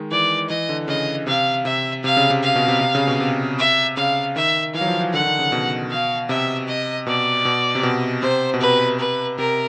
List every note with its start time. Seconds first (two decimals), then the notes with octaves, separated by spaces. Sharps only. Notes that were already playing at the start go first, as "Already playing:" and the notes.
Already playing: D#3 G#3
0.11 E3 D5
0.49 E3 D#5
0.69 D3
0.88 C#3 D#5
1.27 C3 F5
1.65 C3 E5
2.04 C3 F5
2.17 C#3
2.30 C3
2.43 F5
2.55 B2
2.68 C3
2.81 C3
2.95 C#3
3.07 B2
3.20 C3
3.59 E5
3.97 C#3 F5
4.36 D#3 E5
4.74 E3 F5
4.81 F#3
4.87 F3
5.00 E3
5.13 D3 F#5
5.20 D#3
5.26 D3
5.39 C#3
5.52 B2
5.91 F5
6.29 C3 E5
6.68 D#5
7.06 B2 D5
7.45 B2
7.75 C3
7.83 B2
8.22 C3 C5
8.54 B2
8.61 C3 B4
8.99 B4
9.38 C3 A#4